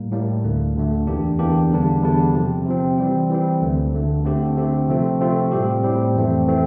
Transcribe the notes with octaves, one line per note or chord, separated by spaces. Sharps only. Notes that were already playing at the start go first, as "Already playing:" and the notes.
Already playing: A2 G3 A#3
A2 G3 A#3
D2 D3 A3
D2 D3 A3
E2 E3 A#3 D4 G4
E2 E3 A#3 D4 G4
E2 D3 G3 D4
E2 D3 G3 D4
C3 F3 C4
C3 F3 C4
E3 G3 C4
E3 G3 C4
D2 D3 A3
D2 D3 A3
D3 A3 C4 G4
D3 A3 C4 G4
C3 F3 A3 C4 F4
C3 F3 A3 C4 F4
A2 G3 C4 G4
A2 G3 C4 G4
F2 E3 A3 C4
E3 A3 C4